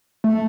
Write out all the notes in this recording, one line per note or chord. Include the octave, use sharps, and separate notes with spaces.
A3